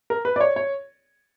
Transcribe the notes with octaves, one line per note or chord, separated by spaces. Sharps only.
A#4
B4
D5
C#5
C#5